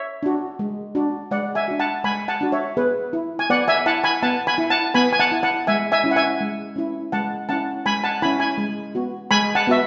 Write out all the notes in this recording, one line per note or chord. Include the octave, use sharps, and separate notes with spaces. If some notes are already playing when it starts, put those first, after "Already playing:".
Already playing: C#5 E5
D4 F#4
G#3
D4 F#4
G#3 D5 F#5
E5 G#5
D4 F#4
F#5 A5
G#3 G#5 B5
F#5 A5
D4 F#4
C#5 E5
B3 G#4 B4
E4
G#5
B3 D5 F#5
E5 G#5
E4 F#5 A5
G#5 B5
B3 F#5 A5
G#5 B5
E4
F#5 A5
B3 G#5 B5
G#5
F#5 A5
E4
F#5 A5
G#3 E5 G#5
E5 G#5
C#4 E4
F#5
E5 G#5
G#3
C#4 E4
G#3 F#5 A5
C#4 E4 F#5 A5
G#3 G#5 B5
F#5 A5
C#4 E4 G#5 B5
G#5 B5
G#3
B3 F#4
G#3 G#5 B5
F#5 A5
B3 F#4 E5